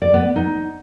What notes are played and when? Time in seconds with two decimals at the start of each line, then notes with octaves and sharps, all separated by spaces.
0.02 D5
0.14 B3
0.36 D#4